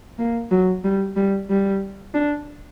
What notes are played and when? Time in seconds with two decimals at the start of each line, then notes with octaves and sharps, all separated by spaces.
0.18 A#3
0.51 F#3
0.84 G3
1.16 G3
1.49 G3
2.14 D4